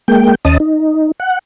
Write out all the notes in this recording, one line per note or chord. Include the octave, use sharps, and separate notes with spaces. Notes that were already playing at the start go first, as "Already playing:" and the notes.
G#3 A#3 G5
D#2 C#4 D#5 A5 D#6
D#4
F#5